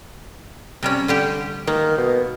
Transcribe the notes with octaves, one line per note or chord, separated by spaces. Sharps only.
C3 G3 C#4
D3 G3 G4
D#3 A#3
B2